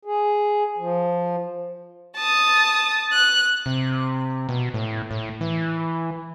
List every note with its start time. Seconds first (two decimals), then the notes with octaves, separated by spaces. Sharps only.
0.05 G#4
0.78 F3
2.16 A5 D#6
3.12 F#6
3.66 C3
4.49 B2
4.74 A2
5.11 A2
5.41 E3